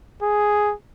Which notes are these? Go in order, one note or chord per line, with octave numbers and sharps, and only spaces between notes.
G#4